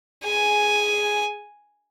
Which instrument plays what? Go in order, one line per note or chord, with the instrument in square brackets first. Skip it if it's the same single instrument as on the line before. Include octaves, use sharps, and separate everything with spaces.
[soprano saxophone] G#4 [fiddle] G#5